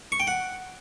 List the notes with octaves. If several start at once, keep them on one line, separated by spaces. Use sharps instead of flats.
C#6
G5
F#5